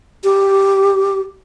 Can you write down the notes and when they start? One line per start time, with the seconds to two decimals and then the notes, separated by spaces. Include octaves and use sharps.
0.24 G4